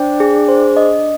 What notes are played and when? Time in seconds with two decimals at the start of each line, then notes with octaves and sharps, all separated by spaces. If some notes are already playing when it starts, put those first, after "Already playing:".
Already playing: D4 C5 G5
0.20 G#4
0.48 C5
0.77 D#5